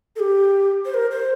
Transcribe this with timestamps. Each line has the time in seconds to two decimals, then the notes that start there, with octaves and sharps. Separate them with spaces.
0.16 A4
0.20 G4
0.85 C5
0.94 A#4
1.11 C5